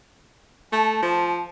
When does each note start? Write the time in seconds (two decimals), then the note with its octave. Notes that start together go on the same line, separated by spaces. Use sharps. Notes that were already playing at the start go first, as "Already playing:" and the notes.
0.72 A3 A5
1.02 F3